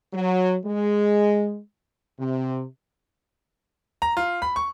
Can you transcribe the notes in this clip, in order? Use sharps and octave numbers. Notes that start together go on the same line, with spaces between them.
F#3
G#3
C3
A#5
F4
B5
C#6